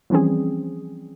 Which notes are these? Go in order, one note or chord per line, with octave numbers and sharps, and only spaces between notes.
E3 F3 G3 C4 C#4 G#4